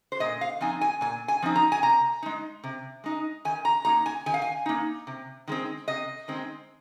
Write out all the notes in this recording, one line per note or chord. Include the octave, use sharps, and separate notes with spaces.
C5
A#2 D#5
F5
F3 C4 D#4 G#5
G#5
A#2 G#5
G#5
F3 C4 D#4
A#5
G#5
C3 A#5
G#3 D#4
C3
G#3 D#4
D#3 G#5
A#5
A#3 D#4 A#5
G#5
D#3 G#5
F5
G#5
A#3 D#4
C3
D#3 G#3 C4
C3 D#5
D#3 G#3 C4